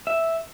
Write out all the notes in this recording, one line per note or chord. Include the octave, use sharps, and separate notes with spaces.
E5